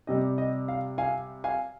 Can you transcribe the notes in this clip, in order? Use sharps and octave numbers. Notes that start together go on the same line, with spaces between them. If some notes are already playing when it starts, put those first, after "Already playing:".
C3 G3 D#5
D#5
F5
F5 G#5
F5 G#5